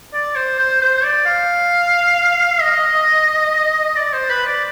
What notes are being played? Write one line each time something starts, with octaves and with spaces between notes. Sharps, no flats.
D5
C5
C5
C5
D5
F5
D#5
D5
C5
B4
D5